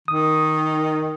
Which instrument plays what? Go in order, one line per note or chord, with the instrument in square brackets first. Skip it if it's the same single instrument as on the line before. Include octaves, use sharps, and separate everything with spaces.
[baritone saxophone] D#3 [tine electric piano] D#6